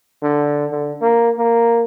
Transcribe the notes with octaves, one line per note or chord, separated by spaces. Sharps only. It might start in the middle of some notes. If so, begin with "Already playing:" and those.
D3
D3
A#3
A#3